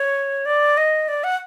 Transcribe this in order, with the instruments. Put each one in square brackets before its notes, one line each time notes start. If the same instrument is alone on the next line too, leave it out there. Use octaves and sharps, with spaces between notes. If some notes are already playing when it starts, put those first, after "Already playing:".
Already playing: [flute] C#5
D5
D#5
D5
F#5